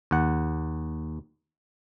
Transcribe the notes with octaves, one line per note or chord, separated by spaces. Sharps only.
D#2 F#5